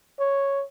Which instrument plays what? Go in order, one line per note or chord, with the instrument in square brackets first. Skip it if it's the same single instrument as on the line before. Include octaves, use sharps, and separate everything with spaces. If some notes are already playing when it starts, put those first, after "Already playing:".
[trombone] C#5